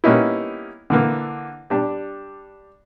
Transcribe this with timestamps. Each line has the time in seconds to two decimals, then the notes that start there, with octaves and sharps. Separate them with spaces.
0.04 G3 A#3 B3 C#4 D#4 E4
0.90 D3 E3 A#3
1.70 G3 D4